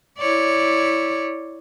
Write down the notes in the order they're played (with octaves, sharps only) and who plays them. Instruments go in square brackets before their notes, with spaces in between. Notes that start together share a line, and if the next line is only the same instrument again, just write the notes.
[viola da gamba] E4 C#5 D5